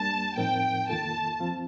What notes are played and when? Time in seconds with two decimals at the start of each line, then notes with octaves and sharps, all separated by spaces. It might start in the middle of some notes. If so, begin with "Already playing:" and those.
Already playing: G3 A#3 D4 A5
0.37 A2 F3 C4 D#4 A#4 G5
0.88 D#3 A#3 F4 A4 A5
1.40 F3 C4 F4